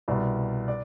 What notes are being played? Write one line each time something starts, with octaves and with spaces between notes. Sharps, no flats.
C2 B2 D5
D5